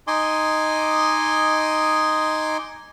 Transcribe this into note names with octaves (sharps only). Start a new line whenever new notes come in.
D#4 D#5 G#5 C6 D6